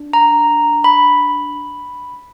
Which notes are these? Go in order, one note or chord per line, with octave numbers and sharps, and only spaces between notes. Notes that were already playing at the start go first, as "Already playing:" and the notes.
Already playing: D4
A#5
B5